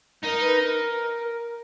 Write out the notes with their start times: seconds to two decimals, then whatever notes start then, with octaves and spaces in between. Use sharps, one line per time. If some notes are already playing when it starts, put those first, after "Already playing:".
0.24 D#4 A#4
0.41 B4
0.59 A#4